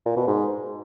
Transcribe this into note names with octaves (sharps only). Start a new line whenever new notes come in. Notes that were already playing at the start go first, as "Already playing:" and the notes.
A#2
B2
G#2